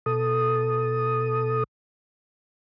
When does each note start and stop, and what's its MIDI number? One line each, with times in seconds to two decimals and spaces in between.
0.06 1.63 47
0.06 1.63 69
0.06 1.63 87